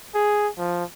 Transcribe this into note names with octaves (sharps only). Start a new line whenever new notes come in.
G#4
F3